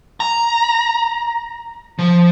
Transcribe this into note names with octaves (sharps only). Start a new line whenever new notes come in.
A#5
F3